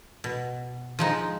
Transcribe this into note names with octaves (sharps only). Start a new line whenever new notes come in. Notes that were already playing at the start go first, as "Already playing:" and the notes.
B2
F3 G#3 D#4